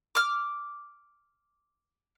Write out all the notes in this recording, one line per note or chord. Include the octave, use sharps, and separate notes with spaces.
D6 F6